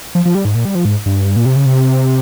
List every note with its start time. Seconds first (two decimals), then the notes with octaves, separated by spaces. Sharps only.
0.15 F3
0.25 F3
0.35 G3
0.45 G#2
0.55 A#2
0.65 G3
0.75 F3
0.85 G#2
1.06 G2
1.36 A#2
1.46 C3
1.56 C#3
1.66 C3